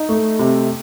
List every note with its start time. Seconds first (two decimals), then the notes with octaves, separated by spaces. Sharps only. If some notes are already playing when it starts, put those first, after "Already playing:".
Already playing: D#4
0.09 A3
0.39 C3